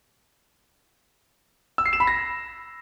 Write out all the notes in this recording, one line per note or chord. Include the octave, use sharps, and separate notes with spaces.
E6
C7
E7
B5
A#6